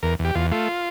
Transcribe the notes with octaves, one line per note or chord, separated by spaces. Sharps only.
E2 A#4
E2
G4
E2 F4
A3 F4